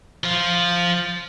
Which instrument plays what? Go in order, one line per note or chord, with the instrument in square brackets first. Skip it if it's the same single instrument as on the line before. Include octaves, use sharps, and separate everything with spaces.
[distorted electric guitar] F3 F4